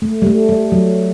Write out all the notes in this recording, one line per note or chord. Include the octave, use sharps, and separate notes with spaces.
A3
G3
A3
G3
F#3